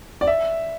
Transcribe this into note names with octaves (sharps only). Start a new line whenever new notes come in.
D5
E5